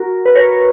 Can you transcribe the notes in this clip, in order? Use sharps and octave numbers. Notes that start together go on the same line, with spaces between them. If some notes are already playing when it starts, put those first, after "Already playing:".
Already playing: F#4 A#4
B4
A#4 C#5